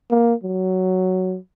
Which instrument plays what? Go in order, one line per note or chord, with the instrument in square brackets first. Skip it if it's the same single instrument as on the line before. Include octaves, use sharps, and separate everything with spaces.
[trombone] A#3
F#3